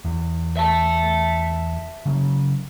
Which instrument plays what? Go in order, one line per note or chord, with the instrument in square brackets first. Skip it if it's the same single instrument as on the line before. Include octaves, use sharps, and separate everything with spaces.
[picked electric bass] E2
[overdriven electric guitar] E5 A5
[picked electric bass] C#3 F#3